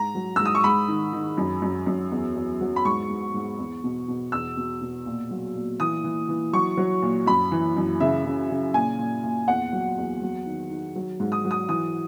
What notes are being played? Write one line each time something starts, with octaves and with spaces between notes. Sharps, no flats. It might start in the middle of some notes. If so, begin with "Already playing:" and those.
Already playing: G#2 A#5
F#3
G#2 E6
D#6
C#6
G#2 B5
D#3
D#3
F#2
F#2
F#2
E2
E2
F#3
B5
G#2 C#6
G#2
G#2
E2
B2
B2
E2 E6
B2
B2
A#2
F#3
A#2
E3 D#6
E3
E3
F#3 C#6
F#3
A#2
F#2 B5
E3
F#2
C#3 E5
C#3
C#3
A#2 G#5
A#2
A#2
E2 F#5
F#3
E2
F#3
D#3
D#3
F#3
G#2
D#6
F#3
D#6
E3 D#6